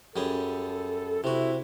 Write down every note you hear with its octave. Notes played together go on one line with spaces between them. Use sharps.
F#2 G3 G#4 A4
C3 E4 F#4